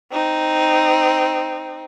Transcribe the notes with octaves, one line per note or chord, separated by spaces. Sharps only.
C4 D#4